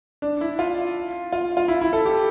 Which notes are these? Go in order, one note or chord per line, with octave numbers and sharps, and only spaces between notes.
D4
E4
F4
F4
F4
E4
E4
A4
G4